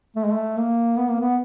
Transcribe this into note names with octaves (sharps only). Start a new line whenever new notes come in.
A3
G#3
A3
A#3
B3
A#3
B3